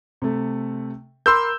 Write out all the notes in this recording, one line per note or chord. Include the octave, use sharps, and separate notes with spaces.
C3 A3
A#4 B5 C6 D6 E6 G6